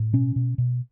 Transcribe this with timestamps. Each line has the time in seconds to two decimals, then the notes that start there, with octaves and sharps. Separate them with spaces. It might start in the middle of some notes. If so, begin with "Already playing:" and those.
Already playing: A2
0.13 B2 C#4
0.36 B2
0.58 B2